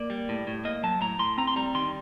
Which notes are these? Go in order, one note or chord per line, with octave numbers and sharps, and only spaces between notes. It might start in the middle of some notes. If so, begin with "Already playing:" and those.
Already playing: A#3 D5
G3
A2
A2
A#3 D#5
F#3 A5
A2 A#5
A2 C6
C4 A#5
C6
G3 A#5
D#3 C6